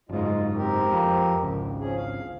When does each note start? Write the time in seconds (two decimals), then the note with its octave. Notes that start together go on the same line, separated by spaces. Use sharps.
0.09 F#1 G#2 G#3 F4
0.56 C4 G4 A#4
0.92 F2
1.43 G#1 C#2
1.80 F3 C#4 G#4
1.96 F5